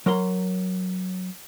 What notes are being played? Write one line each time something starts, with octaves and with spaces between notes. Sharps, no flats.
F#3 A#4 C#5 A#5 C6